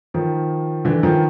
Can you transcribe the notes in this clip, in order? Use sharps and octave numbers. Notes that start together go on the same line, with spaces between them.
D#3 F3
D3 E3
D#3 F3